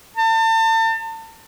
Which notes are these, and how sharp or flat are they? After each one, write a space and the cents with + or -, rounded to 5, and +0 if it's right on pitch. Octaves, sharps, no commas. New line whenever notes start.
A5 +35